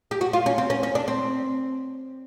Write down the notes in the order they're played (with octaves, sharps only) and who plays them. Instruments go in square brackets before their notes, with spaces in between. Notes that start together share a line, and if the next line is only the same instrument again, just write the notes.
[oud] G4
F#4
F4
C#4
C4
C#4
C#4
D4
C4